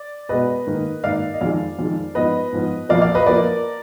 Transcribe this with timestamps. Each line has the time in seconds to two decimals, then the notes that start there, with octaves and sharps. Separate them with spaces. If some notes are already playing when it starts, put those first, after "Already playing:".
Already playing: D5
0.29 B2 G#3 B3 B4 D#5
0.66 G#2 D#3 A#3
1.04 G#2 D#3 A#3 D5 F5
1.33 D#5
1.41 F2 D#3 G#3 D5 F5
1.79 F2 D#3 G#3
2.15 G#2 F3 B3 B4 D#5
2.52 G#2 F3 B3
2.89 F2 F3 A#3 D5 F5
3.02 D5 F5
3.15 B4 D#5
3.26 F3 A#3 A#4 D5